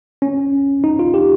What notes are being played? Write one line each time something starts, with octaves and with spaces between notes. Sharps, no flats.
C#4
D#4
F4
G4